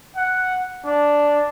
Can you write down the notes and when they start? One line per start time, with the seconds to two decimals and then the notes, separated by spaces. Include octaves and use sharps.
0.17 F#5
0.85 D4